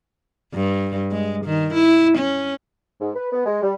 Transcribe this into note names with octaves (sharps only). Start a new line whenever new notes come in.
G2
G#3
D#3
E4
C#4
G#2
B4
B3
G#3
G3